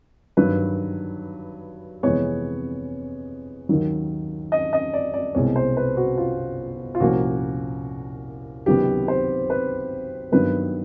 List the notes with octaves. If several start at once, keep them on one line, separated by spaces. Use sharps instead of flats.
G2 D#3 F#3 B4
F2 C3 E3 G#3 B3 C#5
D#2 D#3 F#3
D#5
D#5
D5
D5
C2 B2 G#3 C4 C#5
C5
B4
F#4
F4
F4
C2 A#2 F3 A#3 C#4 F#4
C#2 C3 D#3 F#3 B3 G4
C5
B4
G2 D#3 F#3 B3 B4